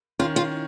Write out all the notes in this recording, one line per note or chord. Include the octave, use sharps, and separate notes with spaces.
D#3 C#4 F4
F4